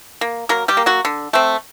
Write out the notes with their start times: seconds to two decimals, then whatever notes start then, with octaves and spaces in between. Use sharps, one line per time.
0.21 A#3
0.49 F#3 A#3 A#4
0.68 G3 G4
0.77 A#3
0.86 F#3 F#4
1.05 D3
1.33 A3 C4